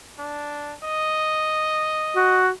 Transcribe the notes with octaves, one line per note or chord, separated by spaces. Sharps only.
D4
D#5
F#4